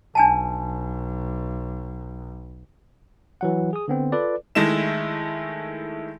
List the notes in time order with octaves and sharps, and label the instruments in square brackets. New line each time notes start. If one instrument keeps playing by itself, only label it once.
[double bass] B1 [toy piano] D4 G#5 A5
[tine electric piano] E3 F#3 F#5
G#4 D#6
D3 B3 C4
F4 A4 B4 D5
[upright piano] D#3 G#3 A3 E4 E7